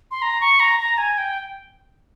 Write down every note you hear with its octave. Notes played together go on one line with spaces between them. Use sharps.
C6
A#5
C#6
A#5
A#5
G#5
G5